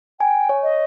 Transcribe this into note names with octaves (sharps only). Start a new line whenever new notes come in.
G5 G#5
C#5
D#5